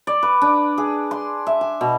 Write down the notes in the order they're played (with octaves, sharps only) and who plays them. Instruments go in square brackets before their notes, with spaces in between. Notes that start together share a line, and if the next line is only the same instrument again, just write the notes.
[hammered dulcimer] D5
B4
D4
G#4
C6
E5
G#5
B2